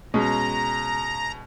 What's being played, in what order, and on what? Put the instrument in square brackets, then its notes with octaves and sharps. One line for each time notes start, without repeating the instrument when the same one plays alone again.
[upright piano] B2 G#3 C#4 [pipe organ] A#5